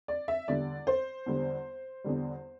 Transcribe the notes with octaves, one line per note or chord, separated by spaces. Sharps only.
D5
E5
E2 D3 G3 D5
C5
E2 D3 G3
E2 D3 G3